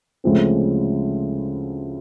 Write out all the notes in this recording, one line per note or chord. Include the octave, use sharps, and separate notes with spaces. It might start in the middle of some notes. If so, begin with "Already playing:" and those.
D2 C#3 F3 G#3 C4